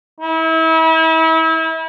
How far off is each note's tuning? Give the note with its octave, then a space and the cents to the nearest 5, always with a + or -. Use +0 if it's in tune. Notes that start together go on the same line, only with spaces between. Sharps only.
E4 -35